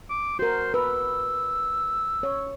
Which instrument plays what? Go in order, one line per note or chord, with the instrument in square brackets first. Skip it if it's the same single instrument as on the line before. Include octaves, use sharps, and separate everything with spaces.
[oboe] D6
[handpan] F#4 A#4 [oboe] C5
[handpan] B4 [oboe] E6
[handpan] C#5